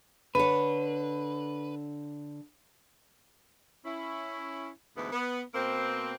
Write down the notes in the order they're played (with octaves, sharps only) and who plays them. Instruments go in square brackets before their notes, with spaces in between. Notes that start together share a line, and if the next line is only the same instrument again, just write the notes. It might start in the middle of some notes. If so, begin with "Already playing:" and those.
[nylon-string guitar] D3 C#5 [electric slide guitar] B4
[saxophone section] C#4 E4
D2 G#2 E3 B3
B3
B2 A#3 C4